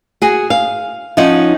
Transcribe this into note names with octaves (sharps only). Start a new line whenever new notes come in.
F#4 G#4
F5
F3 C#4 D#4 F#5